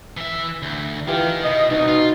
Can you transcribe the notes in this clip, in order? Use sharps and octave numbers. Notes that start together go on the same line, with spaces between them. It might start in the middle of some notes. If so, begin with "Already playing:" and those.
E3 E5
D2
D#3 E3 F4 G4
B2 D#5
C2 B2 D#4
F4